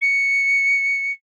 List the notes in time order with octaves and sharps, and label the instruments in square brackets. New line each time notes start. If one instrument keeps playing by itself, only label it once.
[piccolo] C#7